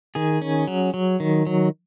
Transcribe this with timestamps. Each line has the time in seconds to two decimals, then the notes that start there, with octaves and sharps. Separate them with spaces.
0.15 D#3 G#4
0.42 C#4
0.67 F#3
0.94 F#3
1.20 D#3
1.47 F#3